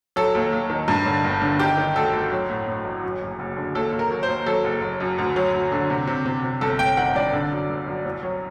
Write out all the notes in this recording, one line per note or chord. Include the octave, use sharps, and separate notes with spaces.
F#3 A4
D#2
D#2
D#3
G2
D3
G1
D3
D#3 G4
D#3
D2 A4
D2
F#3
A2
A2
A1
F#2
F#1
F#1
D3
D#2 A4
D#2
A#4
F#3
C5
D#2
F#3 A4
F#1
F#1
F#2
D2
F#3
D2
D3
C3
C3
C3
C3
G1 A4
G1 G5
D#3 F#5
G2 D5
D3
F#2
G1
F#2
C2
F#3